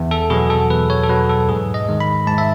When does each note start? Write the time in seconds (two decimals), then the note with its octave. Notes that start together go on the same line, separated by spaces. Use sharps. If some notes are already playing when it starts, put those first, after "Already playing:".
Already playing: E2
0.11 A4
0.30 B2 F#3 B3 G#4
0.50 A4
0.70 E2 B4
0.90 C#5
1.04 A4
1.09 B2 F#3 B3 B4
1.30 A4
1.49 G#2 G#4
1.74 D#5
1.88 D#3 G#3
2.00 B5
2.27 G#2 A5
2.38 E5